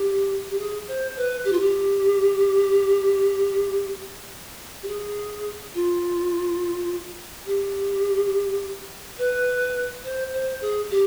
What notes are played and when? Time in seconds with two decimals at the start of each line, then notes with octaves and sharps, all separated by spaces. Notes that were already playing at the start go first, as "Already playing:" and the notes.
Already playing: G4
0.49 G4
0.59 G#4
0.88 C5
1.17 B4
1.45 G4
1.52 F4
1.60 G4
4.83 G4
4.88 G#4
5.75 F4
7.46 G4
9.18 B4
10.04 C5
10.33 C5
10.61 G#4
10.91 G4